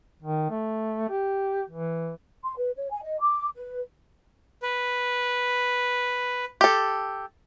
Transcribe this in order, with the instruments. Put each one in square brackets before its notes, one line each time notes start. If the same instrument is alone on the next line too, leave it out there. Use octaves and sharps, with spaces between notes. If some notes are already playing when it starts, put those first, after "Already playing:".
[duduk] D#3
A3
G4
E3
[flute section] C6
B4
C#5
G#5
D#5
D6
B4
[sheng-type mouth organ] B4
[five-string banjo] G4 A4